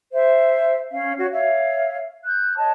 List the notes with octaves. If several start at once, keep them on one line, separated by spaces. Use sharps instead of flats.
C5 E5
C#4 F5
F#4 C#5
C#5 E5 F5
F#6 G6
C#5 D#5 A5